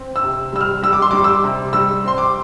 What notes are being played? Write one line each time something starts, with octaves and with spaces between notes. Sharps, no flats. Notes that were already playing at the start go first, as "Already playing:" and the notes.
Already playing: C4
E6
C3
G3 E6
F6
G3 E6
D6
C6
G3 D6
E6
D6
C3
G3 E6
C4 C6
D6